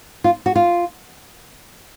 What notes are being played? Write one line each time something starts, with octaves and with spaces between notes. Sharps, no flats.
F4
F#4
F4